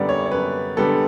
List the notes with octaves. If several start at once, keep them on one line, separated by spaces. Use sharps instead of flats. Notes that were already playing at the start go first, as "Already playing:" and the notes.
Already playing: F#2 D3 G3 B3 D5 F#5
C#5
C#5
F#2 B4
D3 G3 B3 A4